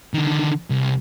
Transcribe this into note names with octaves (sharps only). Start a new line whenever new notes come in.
D3 D#3
C2